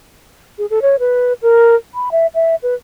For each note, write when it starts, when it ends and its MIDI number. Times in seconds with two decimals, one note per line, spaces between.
0.58 0.66 68
0.70 0.79 69
0.82 0.96 73
1.00 1.33 71
1.42 1.75 70
1.95 2.09 83
2.12 2.27 76
2.35 2.55 76
2.63 2.75 71